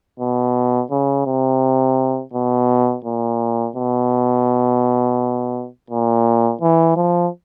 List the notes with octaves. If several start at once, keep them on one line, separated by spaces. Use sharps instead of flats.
B2
C#3
C3
B2
A#2
B2
A#2
E3
F3